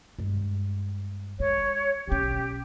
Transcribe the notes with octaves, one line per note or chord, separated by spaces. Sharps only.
G2 G#3
G#3 C#5
B1 C#4 G4